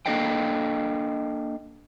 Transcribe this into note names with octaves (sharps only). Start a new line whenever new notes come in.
A#3 D4 A4 D#5 F5 G5